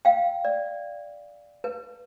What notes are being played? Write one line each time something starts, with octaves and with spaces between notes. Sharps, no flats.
F5 G5
D5
B4